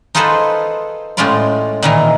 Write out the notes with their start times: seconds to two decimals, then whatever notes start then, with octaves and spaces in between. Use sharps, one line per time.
0.15 D#4 F4 G#4 A4 B4 C5
1.17 A2 G#3 C#4 F4 D5 B5
1.83 A#2 D#3 E3